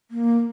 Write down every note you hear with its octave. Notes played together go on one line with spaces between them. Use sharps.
A#3